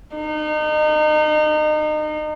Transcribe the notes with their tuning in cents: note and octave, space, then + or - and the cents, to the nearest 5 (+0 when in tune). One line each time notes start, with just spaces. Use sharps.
D#4 -30